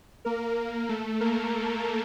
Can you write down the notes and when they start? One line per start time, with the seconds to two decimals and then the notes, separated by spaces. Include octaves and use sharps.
0.25 A#3 A#4
0.89 A3 A4
1.21 A#3 A#4